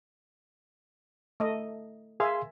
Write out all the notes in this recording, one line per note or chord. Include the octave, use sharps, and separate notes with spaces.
A3 D#5
G#4 A#4 E5 F5 G#5 C6